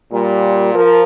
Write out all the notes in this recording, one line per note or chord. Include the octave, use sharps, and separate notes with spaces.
A#2 G3
F3 A#4